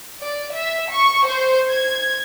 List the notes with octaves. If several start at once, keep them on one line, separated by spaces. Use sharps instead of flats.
D5
E5
C#6
C5
G#6